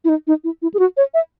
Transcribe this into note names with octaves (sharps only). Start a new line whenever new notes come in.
E4
D#4
D#4
E4
E4
G#4
F#4
C#5
E5